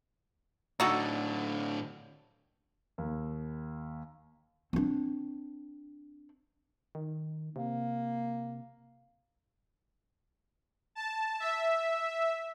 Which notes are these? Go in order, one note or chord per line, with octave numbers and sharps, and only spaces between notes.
A2 D3 D#4 F#4 A4
D#2
C4 D4
D#3
C3 A#3
A5
E5